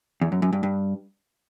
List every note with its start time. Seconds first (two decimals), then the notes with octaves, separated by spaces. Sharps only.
0.21 E2
0.32 F#2
0.42 F#2
0.53 G2
0.63 G2